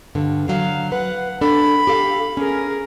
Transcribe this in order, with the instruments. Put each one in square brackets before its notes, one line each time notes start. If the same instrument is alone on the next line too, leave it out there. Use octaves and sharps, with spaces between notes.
[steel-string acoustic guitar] G2 D3
[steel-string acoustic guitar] D3 F#3 [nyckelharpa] F5
[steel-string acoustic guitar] B4 [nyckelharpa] F#5
[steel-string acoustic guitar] D4 A4 [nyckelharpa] B5
[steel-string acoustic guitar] G4 A4 F5
[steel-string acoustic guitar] C#4 [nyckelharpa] G#4 A#4